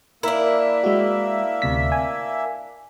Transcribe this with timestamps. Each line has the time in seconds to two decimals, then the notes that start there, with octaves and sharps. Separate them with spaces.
0.23 A#3 D4 E4 A#4 E5
0.84 G#3 F#4
1.62 D2 C3 B6
1.92 G#5